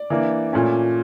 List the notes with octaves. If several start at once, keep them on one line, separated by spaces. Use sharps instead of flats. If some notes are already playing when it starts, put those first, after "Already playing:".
Already playing: D5
E3 A#3 D4
A#2 A3 C#4